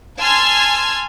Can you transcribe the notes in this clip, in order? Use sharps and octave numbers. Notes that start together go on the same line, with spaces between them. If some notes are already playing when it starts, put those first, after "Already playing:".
G#5 A5 C6 E6 F6 G#6